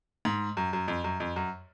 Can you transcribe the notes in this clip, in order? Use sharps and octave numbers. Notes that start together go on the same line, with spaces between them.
G#2
F#2
F#2
F2
F#2
F2
F#2